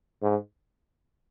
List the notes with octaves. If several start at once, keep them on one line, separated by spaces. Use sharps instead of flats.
G#2